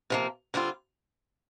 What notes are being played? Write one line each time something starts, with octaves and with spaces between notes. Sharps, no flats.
C3 F3 A#3
D3 G3 C4 F4